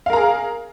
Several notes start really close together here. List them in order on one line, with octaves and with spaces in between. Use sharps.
F5 A#4 A#5 G#4